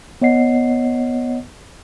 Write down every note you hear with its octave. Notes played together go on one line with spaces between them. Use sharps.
B3 C#5 D#5 F#5 C7